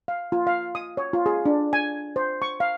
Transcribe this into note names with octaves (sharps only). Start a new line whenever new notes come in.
F5
F4
F5
D#6
C#5
F4
G#4
D4
G#5
C5
C#6
F5